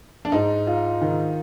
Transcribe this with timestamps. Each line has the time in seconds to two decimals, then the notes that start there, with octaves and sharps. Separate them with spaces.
0.25 D4
0.32 G#2 D#4
0.67 F4
1.01 D#3